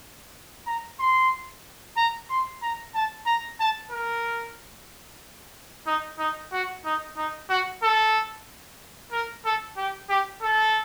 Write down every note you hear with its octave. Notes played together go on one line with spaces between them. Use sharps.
A#5
C6
A#5
C6
A#5
A5
A#5
A5
A#4
D#4
D#4
F#4
D#4
D#4
F#4
A4
A#4
A4
G4
G4
A4